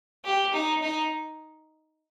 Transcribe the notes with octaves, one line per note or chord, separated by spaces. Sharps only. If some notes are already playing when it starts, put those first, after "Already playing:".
G4
D#4
D#4